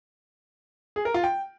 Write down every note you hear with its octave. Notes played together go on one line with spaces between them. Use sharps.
G#4
A#4
F4
G5